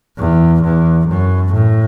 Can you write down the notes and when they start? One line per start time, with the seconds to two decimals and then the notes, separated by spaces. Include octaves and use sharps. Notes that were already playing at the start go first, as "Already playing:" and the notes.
0.17 E2
0.62 E2
1.06 F#2
1.52 A2